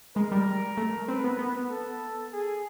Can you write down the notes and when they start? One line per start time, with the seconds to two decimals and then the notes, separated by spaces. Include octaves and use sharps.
0.16 G#3 A#4
0.32 G3
0.77 A3
1.08 C4 B4
1.24 B3
1.39 B3
1.70 A4
2.32 G#4